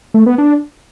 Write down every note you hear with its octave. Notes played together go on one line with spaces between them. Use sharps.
A3
B3
D4